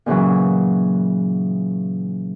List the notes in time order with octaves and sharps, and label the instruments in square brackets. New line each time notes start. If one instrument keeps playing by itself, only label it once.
[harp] A#2 C#3 E3 F#3